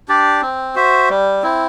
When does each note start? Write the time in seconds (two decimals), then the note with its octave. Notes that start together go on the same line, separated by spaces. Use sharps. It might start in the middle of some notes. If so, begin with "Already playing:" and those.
0.08 D4 G4 D5
0.42 C4
0.75 F#4 C5 E5
1.09 G3
1.42 C4 E4